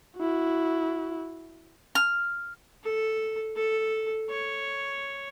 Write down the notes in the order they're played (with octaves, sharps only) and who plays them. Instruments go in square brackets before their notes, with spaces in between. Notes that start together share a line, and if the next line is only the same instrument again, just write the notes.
[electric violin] E4 F#4
[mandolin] F6
[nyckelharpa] A4
A4
C#5